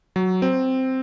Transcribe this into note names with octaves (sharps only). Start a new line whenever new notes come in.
F#3
C4